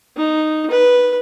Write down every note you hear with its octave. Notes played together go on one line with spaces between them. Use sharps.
D#4
B4